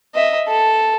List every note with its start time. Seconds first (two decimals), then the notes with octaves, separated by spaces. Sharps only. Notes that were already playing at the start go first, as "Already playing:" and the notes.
0.15 D#5 E5
0.48 A4